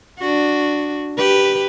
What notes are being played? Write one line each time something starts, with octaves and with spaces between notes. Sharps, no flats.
D4 F#4
G4 B4